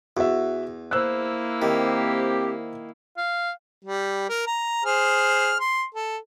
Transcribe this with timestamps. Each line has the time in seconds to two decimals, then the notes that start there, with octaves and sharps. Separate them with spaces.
0.17 E2 F#4 E5
0.91 A#3 E4 C5 E6 F#6
1.62 D#3 C4 G4
3.18 F5
3.85 G3
4.29 A#4
4.47 A#5
4.85 G#4 C5 F6
5.60 C6
5.95 A4